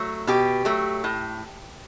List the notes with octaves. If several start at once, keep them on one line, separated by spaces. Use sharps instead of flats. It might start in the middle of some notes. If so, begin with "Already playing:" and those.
Already playing: F#3 A3
B2 G4
F#3 A3
A2